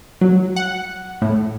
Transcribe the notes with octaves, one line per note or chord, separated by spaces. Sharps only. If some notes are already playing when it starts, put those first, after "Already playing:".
F#3
F#5
A2